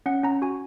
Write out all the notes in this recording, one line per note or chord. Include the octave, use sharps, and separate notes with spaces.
C#4 F#5
C#4 A#5
F#4 G#5